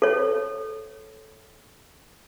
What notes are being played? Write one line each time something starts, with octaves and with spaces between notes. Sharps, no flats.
A4 C#5